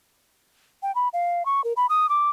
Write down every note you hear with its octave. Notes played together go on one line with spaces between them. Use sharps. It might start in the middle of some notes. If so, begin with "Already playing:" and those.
G5
B5
F5
C#6
A#4
B5
D#6
D6